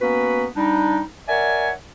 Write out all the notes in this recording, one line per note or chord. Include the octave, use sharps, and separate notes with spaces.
A#3 B3 C#4 F#4 B4
G3 D4 D#4
A#4 C#5 D5 E5 F#5 G#5